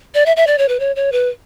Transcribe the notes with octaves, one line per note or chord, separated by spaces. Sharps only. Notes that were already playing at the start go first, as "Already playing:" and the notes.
D5
E5
E5
D5
C#5
B4
C#5
C#5
B4